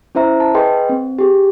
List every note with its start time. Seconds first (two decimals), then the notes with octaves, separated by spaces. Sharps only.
0.15 C#4 E4 C5 E5 A#5
0.40 A5
0.54 G#4 B4 D#5 G5 C6
0.89 C4
1.19 G4 G#4